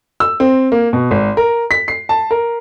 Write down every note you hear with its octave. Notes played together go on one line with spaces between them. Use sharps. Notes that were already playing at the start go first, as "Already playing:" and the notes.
E6
C4
A#3
B2
G#1
A#4
B6
C7
A5
A#4